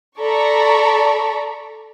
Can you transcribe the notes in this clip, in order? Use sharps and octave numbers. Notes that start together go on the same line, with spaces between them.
A4 D5 A#5 B5 C#6